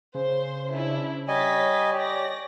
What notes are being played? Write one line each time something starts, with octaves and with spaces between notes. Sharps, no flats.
C#3 C5 C6
C#4 D4 E4
G3 C#5 D#5 G#5 A6 B6
G4 D5 A#6